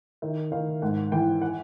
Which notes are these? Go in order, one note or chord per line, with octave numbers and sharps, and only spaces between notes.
D#3 E5
D#3 F5
G#2 F#5
E3 G5
F#5